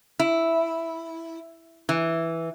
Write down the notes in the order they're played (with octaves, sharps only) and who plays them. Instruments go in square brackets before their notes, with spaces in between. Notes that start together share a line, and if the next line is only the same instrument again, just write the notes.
[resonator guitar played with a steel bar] E4
E3